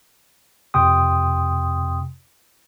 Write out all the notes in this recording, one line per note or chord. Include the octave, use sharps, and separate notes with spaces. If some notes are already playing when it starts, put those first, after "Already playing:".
F2 C3 G5 C6 D#6